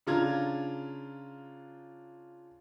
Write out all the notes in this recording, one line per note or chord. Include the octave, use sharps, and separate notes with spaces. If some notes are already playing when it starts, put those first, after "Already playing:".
C#3 D4 F4 A#5 G#6